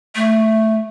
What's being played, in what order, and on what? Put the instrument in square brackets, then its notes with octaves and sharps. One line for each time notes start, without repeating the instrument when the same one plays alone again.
[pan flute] A3